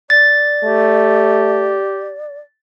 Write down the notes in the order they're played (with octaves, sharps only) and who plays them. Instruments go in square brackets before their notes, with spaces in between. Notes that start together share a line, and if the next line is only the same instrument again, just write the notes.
[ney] D5 [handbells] A6
[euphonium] A3 [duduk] G4